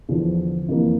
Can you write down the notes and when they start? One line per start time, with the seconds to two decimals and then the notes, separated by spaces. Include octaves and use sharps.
0.09 E2 D3 F3
0.68 F2 E3 A#3